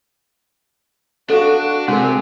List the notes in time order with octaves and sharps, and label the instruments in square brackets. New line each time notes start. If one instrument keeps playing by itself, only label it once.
[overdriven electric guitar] D4 [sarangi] F#4 [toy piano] A4 F5
[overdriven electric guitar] C3 [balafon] G#3 [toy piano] F#4 A#4 [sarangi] G#4